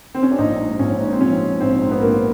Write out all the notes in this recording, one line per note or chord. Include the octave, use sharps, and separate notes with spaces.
C4
C#4
D4
A#1 D#4
G#2
A#1 C#4
G#2
C4
F3 C#4
G#2
A#1 C4
G#2
B3
A#1 A#3